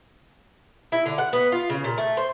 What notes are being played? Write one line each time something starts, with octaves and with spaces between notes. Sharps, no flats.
E4
D3
F#5
B3
F4
C#3
A#2
A3
C5